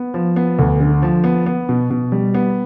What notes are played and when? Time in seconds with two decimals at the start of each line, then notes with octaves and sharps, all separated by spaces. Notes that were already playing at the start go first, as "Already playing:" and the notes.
Already playing: B3
0.14 F3
0.36 B3
0.59 D2
0.80 D3
1.02 F3
1.24 B3
1.46 B3
1.69 B2
1.90 B2
2.12 G3
2.34 B3